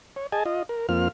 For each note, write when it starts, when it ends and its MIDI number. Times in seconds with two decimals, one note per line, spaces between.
0.16 0.27 73
0.32 0.44 68
0.32 0.44 75
0.32 0.44 80
0.32 0.44 81
0.46 0.63 65
0.46 0.63 75
0.69 0.87 70
0.89 1.08 41
0.89 1.08 58
0.89 1.08 60
0.89 1.08 65
0.89 1.08 89